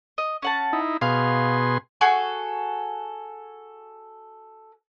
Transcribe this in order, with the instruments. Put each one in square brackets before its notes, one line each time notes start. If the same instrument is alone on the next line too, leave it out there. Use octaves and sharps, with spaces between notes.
[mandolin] D#5
C#4 F#5 A5
[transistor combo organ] D#4 E4
[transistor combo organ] B2 G#4 C6 [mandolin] F5
[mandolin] F#4 G#4 A4 C#6